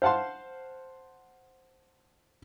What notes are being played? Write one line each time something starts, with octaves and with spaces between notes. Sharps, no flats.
C5 F5 F#5 A5 C6